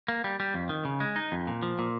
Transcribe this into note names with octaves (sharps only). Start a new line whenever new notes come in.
A#3
G3
G3
F2
D#3
C#3
G#3
D#4
F2
A#2
F3
A#2